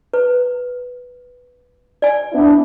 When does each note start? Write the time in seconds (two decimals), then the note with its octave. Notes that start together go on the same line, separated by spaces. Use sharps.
0.13 B4
2.02 D5 G#5
2.33 B3 D4 E4